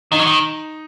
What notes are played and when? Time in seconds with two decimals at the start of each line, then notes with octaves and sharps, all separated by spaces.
0.12 D#3 D#4
0.20 F#3
0.26 D#3